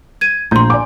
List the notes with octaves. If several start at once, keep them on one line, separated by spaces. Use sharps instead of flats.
G#6 D#7
A#1 A#5 C6 G6
D5 G#5 D6